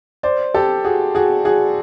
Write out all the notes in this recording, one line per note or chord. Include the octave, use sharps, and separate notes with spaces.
C5 D5
G4 A4
F#4 G#4
F#4 G#4
F#4 G#4